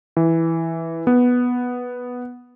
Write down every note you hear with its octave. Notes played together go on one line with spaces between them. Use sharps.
E3
B3